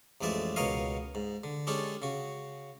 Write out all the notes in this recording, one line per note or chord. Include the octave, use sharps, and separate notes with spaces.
A1 F2 G#3 D5 E5
C#2 B2 A#4 C#5 D#5 F5
G#2
D3
G#3 C#4 D4 G4 A4
C#3 F#4